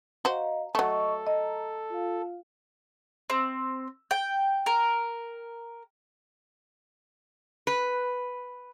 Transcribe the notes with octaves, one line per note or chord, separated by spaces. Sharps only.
F#4 C5 D#5 F5 A#5
F#3 A3 A4 D#5 C#6
D#5 A#5
F4 F5
C4
G5
A#4
B4